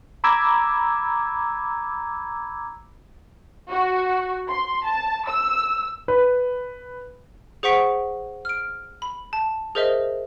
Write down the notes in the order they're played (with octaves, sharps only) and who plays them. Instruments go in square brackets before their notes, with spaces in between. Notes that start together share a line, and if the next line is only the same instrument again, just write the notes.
[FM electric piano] A#5 B5 D6 E6 G#6
[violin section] F#4
C6
A5
E6
[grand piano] B4
[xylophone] G#4 C5 F#5 C#6 B6 D7
F6 D7
B5
A5
G#4 A#4 C5 D#5 E5